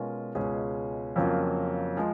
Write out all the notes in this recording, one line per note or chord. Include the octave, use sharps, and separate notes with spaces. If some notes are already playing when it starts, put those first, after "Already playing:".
Already playing: B2 G#3 C#4 F4 A#4
C#2 B2 G#3 C#4 G#4
F2 C#3 F#3 A#3 F4
F3 G#3